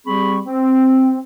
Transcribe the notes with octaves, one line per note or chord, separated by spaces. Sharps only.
G3 C4 G4 G#4 B5 C#6
C4